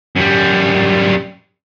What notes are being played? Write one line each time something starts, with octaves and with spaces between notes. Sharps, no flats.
F#2 G3